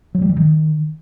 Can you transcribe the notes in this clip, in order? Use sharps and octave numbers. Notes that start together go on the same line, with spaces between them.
F#3
G3
E3
D#3